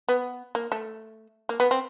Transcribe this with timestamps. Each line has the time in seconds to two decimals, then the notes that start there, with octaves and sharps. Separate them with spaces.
0.09 B3
0.55 A#3
0.72 A3
1.49 A#3
1.60 B3
1.71 C4